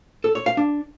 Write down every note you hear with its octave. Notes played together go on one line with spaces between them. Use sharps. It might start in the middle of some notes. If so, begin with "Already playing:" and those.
A4
C#5
F5
D4